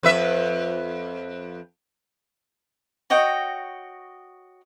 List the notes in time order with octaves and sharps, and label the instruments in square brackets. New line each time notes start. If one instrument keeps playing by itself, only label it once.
[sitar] F2 B4 E5
[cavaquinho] F#4 C#5 D#5 G5